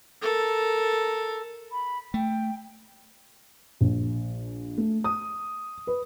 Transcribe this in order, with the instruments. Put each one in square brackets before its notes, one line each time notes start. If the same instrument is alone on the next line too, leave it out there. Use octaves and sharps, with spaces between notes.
[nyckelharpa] A4 A#4
[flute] B5
[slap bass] A3 [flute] G5
[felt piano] A#1
A3
D#6
B4